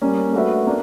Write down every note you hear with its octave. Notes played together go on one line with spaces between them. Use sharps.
G3 A#3 C#4
A3 D4 F#4 B4 E5
A#3 D4